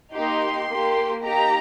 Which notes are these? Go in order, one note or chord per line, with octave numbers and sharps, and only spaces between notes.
A#3 D#4 G4 C6
A#3 G4
A#3 D#4 G4 A#5